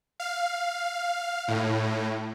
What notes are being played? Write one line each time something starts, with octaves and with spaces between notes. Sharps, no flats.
F5
A2